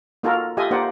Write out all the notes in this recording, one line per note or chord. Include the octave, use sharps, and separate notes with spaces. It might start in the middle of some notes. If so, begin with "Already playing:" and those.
A#3 D#4 F4 F#4 A4 A#4
F4 G4 A4 D#5 E5 G#5
A#3 D#4 G4 C5 D5 F#5